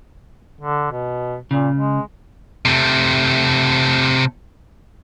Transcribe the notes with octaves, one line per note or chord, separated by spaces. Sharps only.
D3
B2
A#2 C#3
G#3
C3 A3